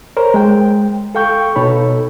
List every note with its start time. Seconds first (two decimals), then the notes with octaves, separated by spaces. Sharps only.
0.17 A#4 C5 C#5 A#5
0.34 G#3 G5
1.15 A4 F5 G5 C#6 G6
1.56 B2 D#4 A4 C#5 B5